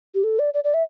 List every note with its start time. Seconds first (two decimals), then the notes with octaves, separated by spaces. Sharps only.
0.14 G4
0.24 A4
0.39 D5
0.54 D5
0.64 D5
0.74 E5